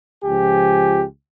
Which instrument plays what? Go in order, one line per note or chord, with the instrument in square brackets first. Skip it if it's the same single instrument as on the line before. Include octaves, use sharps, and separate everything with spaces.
[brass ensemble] C#2 F3 G4 G#5